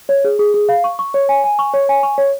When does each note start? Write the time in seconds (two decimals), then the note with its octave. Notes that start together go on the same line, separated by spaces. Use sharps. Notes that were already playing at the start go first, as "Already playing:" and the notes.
0.09 C#5
0.25 G#4
0.39 G#4
0.54 G#4
0.69 F5
0.84 C#6
0.99 C#6
1.14 C#5
1.29 G#5
1.44 G#5
1.59 C#6
1.74 C#5
1.89 G#5
2.03 C#6
2.18 C#5